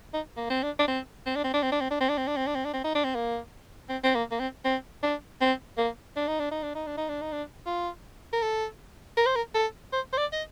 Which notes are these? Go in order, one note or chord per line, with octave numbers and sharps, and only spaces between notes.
D#4
A#3
C4
D4
D4
C4
C4
D4
C4
D4
C4
D4
C4
D4
C4
D4
C4
D4
C4
D4
C4
D4
C4
D#4
D4
C4
A#3
C4
C4
A#3
A#3
C4
C4
D4
C4
A#3
D4
D#4
D4
D#4
D4
D#4
D4
D#4
D4
D#4
D4
F4
A#4
A4
A#4
C5
A#4
A4
C5
C5
D5
D#5